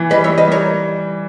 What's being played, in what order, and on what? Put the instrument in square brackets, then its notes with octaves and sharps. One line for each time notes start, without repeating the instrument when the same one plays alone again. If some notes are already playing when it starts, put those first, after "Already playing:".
Already playing: [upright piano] E3
[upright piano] G3 [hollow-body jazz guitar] B4 D#5
[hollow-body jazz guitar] C#5 E5
[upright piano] G3
[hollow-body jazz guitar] B4 D#5
[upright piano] G3 [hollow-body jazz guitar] A#4 C#5